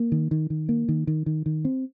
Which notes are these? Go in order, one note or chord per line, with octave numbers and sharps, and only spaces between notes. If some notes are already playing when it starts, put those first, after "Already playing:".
Already playing: A#3
D#3
D#3
D#3
A#3
D#3
D#3
D#3
D#3
C4